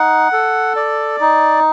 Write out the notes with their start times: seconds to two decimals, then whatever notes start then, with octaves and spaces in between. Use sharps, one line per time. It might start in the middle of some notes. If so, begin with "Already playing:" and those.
Already playing: D#4 F#5
0.32 A4
0.76 D5
1.20 D#4